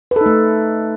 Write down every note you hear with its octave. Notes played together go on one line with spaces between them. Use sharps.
A3 D#4 A4 B4